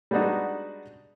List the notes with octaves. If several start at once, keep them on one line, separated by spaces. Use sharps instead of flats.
G3 G#3 B3 D4 D#4 F#4